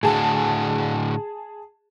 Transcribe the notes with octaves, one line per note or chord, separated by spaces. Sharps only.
A2 D3 F#4 G#4 A5